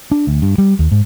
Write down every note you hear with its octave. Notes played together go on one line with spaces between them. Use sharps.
D4
D2
G2
G3
D#2
G#2